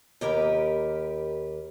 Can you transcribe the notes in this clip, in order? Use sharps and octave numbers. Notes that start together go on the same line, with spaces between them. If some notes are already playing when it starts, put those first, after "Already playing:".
D#2 G4 A#4 B4